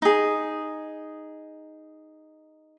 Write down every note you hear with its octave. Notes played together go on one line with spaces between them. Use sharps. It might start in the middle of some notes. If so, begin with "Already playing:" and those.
D#4 G#4